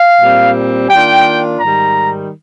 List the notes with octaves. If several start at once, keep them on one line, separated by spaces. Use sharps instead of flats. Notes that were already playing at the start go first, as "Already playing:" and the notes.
Already playing: F5
A#2 G3 C4
D#3 A#3 D4 F4 G5
G#2 D#3 G3 A#5